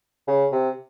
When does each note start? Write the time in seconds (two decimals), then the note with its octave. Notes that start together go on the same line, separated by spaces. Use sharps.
0.28 C#3
0.52 C3